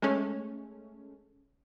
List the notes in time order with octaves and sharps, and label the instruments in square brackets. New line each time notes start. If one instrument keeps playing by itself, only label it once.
[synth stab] G#3 A3 C#4